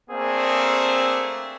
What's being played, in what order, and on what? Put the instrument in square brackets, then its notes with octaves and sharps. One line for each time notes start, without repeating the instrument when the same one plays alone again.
[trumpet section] A3 A#3 C4 D4 G#4